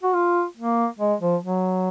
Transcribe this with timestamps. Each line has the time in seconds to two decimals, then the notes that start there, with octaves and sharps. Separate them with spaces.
0.03 F#4
0.14 F4
0.57 A#3
0.99 G#3
1.21 F3
1.43 F#3